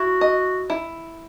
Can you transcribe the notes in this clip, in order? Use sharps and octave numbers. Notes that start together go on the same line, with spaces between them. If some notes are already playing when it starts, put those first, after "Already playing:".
Already playing: E4 F#4
D#5
E4